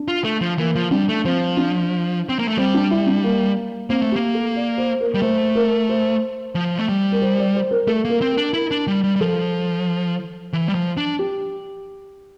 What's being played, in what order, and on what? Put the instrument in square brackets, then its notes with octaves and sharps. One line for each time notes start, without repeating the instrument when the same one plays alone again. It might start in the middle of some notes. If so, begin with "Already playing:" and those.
Already playing: [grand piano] D4
[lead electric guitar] F4
A3
F3
[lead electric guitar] E3 [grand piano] A#3
[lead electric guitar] F3
[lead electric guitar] G3 [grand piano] D4
[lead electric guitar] A3
[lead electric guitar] F3 [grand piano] C4
[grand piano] D4
[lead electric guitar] C4
A#3
A3
[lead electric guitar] G3 [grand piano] C4
[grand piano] D4
E4
D4
A#3
[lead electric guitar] A#3 [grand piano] C4
[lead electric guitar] A3
[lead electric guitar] A#3 [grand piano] G4
[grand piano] A4
D5
C5
A#4
[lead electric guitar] G3
[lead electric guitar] A3 [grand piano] C5
[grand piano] A#4
C5
[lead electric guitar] F3
A3
G3
[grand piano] A#4
C5
D5
C5
A#4
[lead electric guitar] A3 [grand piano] A4
[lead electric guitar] A#3 [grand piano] A#4
[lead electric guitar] C4
[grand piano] A#4
[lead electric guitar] D4
[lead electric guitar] E4 [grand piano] A#4
[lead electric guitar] D4
G3
G3
G3
[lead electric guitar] F3 [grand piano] A4
[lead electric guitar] E3
G3
F3
D4
[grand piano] G4